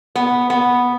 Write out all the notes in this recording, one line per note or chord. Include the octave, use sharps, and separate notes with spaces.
B3
B3